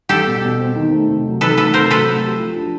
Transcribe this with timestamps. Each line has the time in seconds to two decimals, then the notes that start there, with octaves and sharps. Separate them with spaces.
0.09 G3 G4 A4
0.26 B2
0.43 B2
0.59 C4
0.76 D#3
0.92 A3
1.08 C3
1.25 F#3
1.41 D#3 A4 B4
1.57 A3 A4 B4
1.74 C3 A#4 C5
1.91 F#3 A4 B4
2.07 A3
2.23 G4
2.39 F3
2.56 D4